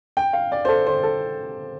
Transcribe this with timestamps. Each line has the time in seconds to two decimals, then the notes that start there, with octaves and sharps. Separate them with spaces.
0.17 G5
0.33 F5
0.52 D5
0.65 C5
0.68 A4
0.86 C5
1.03 A4